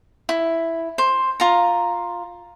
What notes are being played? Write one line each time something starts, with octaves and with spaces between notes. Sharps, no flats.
E4
C5
F4 A#5